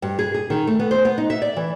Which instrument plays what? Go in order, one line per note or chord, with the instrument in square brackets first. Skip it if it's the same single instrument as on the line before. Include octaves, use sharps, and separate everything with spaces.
[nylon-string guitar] G2
G#4
G#4
D#3
A3
B3
C5
B3
D#4
E5
D5
E3